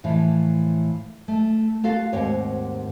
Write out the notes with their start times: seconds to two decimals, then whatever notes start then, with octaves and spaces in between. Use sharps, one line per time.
0.04 A2 E3 F3
1.28 A3
1.84 F4 F#4 A4 F5
2.13 D#2 G#2 C4 G4 C#5 F#5